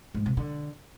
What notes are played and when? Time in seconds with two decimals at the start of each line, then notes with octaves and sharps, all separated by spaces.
0.15 G#2
0.26 C3
0.37 D3